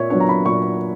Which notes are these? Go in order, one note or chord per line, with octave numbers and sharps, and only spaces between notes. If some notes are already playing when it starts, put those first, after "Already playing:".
Already playing: A#2 C#5 E5
F#3 B3 D4 C#5
A#5
B5
A#2 C#6